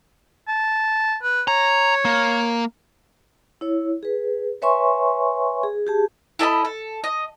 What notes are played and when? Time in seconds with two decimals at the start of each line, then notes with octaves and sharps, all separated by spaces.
0.48 A5
1.23 B4
1.48 C#5 A#5
2.05 A#3
3.61 E4 C#5
4.03 G#4 B4
4.62 B4 C#5 E5 G#5 C6 C#6
5.63 G#4
5.87 G4 G#4 A5
6.39 E4 A4 D#5 B5
6.65 A4
7.04 D#5